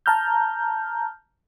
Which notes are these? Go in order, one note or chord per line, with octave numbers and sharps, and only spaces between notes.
A5 A#5 F6 G6